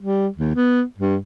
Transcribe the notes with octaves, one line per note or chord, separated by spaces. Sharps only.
G3
D#2
B3
G2